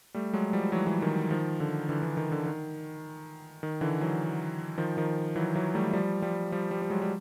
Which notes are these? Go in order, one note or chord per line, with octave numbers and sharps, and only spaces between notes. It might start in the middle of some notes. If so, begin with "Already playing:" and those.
G3 A3
F#3 G#3
F3 G3
E3 F#3
E3 F#3
D#3
D#3 F3
D3
D3 E3
D3 E3
D#3
D3
D#3
D#3
D3 E3
E3 F#3
D#3 F3
D#3 F3
E3 F#3
E3 F#3
G3 A3
F3 G3
F3 G3
F3 G3
F3 G3
G3
F#3 G#3
G3